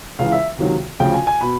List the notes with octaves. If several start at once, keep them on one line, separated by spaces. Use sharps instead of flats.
C#2 C#3 E3 F5
E5
C#2 C3 D#3 F#3
D2 C#3 F3 G5
G#5
G#5
B2 B5